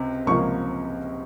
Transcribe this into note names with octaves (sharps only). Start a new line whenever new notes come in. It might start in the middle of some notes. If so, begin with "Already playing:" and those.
Already playing: C#2 C3
C#2 C3 F3 A#3 C#6